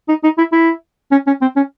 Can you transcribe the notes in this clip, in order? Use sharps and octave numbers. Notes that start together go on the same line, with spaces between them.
D#4
D#4
E4
E4
C#4
C#4
C4
C#4